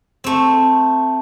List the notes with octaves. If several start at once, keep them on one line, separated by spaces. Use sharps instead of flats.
A3 C4